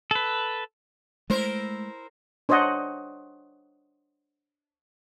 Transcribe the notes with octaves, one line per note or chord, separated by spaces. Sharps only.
A4 B4
G#3 A3 E4 A#4 C5
D4 C5 C#5 D#5 F#5